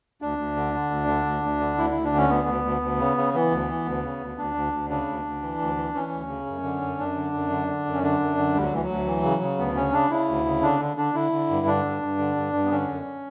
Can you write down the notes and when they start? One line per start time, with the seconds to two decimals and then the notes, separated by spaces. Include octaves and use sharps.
0.22 D2 D4
0.38 D2
0.56 D3
0.74 D3
0.90 D2
1.08 D3
1.26 D2
1.43 D2
1.60 D3
1.77 D2 E4
1.90 D2 E4
2.04 D4
2.12 D3 C#4
2.29 D2 B3
2.48 D2
2.64 D2
2.81 D2
2.99 C#3
3.17 C#3
3.34 E3 B3
3.51 D2
3.68 E3
3.85 D2
4.03 C#3
4.20 D2
4.38 D2 D4
4.55 D2
4.73 D2
4.89 C#3 D4
5.07 D2
5.25 D2
5.42 E3
5.59 D2
5.76 E3
5.94 E3 C#4
6.11 D2
6.29 C#3
6.46 F#2
6.63 D3
6.82 F#2
6.99 F#2 D4
7.16 D3
7.33 F#2
7.50 D3
7.67 D3
7.85 F#2
7.94 C#4
8.02 D3 D4
8.20 F#2
8.38 D3
8.54 D2 G3
8.63 F#3
8.72 D2 E3
8.83 F#3
8.89 D2
9.06 E3
9.23 C#3
9.42 C#3
9.58 D2 B3
9.76 C#3 C#4
9.93 C#3 D4
10.11 C#3 E4
10.28 D2
10.45 C#3
10.62 D3 D4
10.80 D3
10.97 D3 D4
11.14 D3 E4
11.32 D3
11.50 G2
11.67 D3 D4
11.85 G2
12.02 G2
12.18 D3
12.36 G2
12.53 G2
12.65 B3
12.71 D3 C#4
12.88 F#2